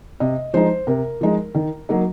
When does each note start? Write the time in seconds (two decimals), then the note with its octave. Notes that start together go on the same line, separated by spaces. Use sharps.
0.20 C3 D#5
0.54 F3 G#3 D#4 C5
0.87 C3 A#4
1.21 F3 G#3 D#4
1.54 D#3
1.89 F#3 A#3 D#4